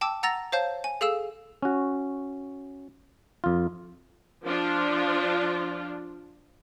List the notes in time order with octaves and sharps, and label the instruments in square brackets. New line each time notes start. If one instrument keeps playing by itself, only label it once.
[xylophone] G5 A5 D6 E6
F#5 A#5 E6 A6 A#6 F7
C5 C#5 F5 A5 G6
G#5
G#4 A4 F5 E6 E7
[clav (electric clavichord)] C#4 F#4
F2 F4
[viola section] F3 D4 F4